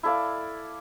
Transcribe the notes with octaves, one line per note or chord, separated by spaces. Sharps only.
E4 A4 D5 F5